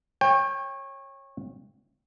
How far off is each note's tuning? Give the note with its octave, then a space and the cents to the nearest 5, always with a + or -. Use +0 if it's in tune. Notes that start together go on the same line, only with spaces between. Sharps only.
C#5 -20 G5 +30